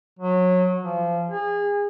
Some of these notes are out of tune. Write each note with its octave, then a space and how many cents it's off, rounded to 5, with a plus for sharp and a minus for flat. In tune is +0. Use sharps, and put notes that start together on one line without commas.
F#3 -25
F3 -25
G#4 -30